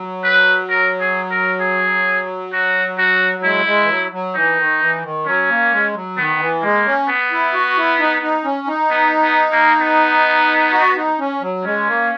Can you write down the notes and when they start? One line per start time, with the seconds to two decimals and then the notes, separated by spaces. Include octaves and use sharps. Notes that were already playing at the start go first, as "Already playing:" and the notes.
Already playing: F#3
0.24 B4
0.70 A#4
1.00 G#4
1.31 A#4
1.60 G#4
2.53 F#4
2.98 F#4
3.43 G#3 E4
3.66 G#3
3.84 E3
3.89 F#3
4.12 F#3
4.34 E3 D#4
4.57 D#3
4.80 E3
5.03 D#3
5.26 F#3 C#4
5.49 A#3
5.71 G#3
5.95 F#3
6.17 D#3 B3
6.40 E3
6.63 G#3 A#3
6.85 C#4
7.09 B3
7.32 E4
7.53 F#4
7.77 E4
7.99 D#4
8.23 D#4
8.45 C#4
8.67 D#4
8.90 B3
9.22 B3
9.52 A#3
9.81 B3
10.73 F#4
10.96 D#4
11.19 C#4
11.41 F#3
11.64 G#3 C#4
11.87 A#3